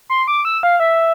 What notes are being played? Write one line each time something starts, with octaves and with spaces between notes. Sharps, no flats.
C6
D6
E6
F5
E5